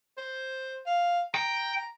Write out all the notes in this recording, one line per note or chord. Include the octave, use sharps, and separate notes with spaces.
C5
F5
G5 A#5